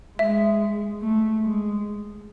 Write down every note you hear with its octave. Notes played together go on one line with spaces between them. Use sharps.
G#3 E5
A3
G#3